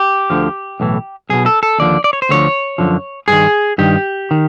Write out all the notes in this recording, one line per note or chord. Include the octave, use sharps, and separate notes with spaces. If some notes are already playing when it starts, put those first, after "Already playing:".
Already playing: G4
D2 D3 F3
B1 A2 E3
B1 B2 G#4
A4
A4
D#2 D3 F3 D5
D5
C#5
C5
D2 D3 F3 C#5
F#2 D3 F3
G2 D#3 G#4
G2 D#3 G4
D#3